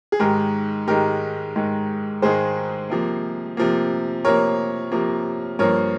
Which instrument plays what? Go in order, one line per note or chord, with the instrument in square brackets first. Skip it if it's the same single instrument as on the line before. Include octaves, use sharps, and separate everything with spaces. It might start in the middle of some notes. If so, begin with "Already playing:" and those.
[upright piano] G#4
G#2 D#3 G#3 G4 A#4
G#2 D#3 G#3 G4 A#4
G#2 D#3 G#3
G#2 D#3 G#3 G#4 C5
C3 F3 A#3
C3 F3 A#3
C3 F3 A#3 A#4 C#5
C3 F3 A#3
G2 F3 A#3 A#4 C#5